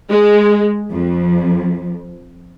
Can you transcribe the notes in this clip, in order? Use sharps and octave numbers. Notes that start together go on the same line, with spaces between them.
G#3
F2